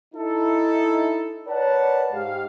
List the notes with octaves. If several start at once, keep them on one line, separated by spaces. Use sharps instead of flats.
D#4 E4 A4
A#4 B4 C#5 D5 F#5 A5
G#2 G4 F5